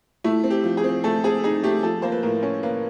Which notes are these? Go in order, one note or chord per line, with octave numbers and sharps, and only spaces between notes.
A3 E4
C4
G4
F3
G#4
C4
A3 A4
C4 G#4
D#4 G#4
A3 G4
F3 A4
A#3 C5
B4
A2 A#4
C#4
A#3 B4